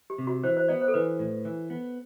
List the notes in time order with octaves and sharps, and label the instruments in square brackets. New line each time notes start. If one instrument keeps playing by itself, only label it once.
[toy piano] G4
[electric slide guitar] C3
[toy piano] F#4
[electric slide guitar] E3 [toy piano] C5
[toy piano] C5
[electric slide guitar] B3 [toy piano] D5
[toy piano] C5
A4
[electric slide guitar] E3 [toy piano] B4
[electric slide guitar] A2
E3
B3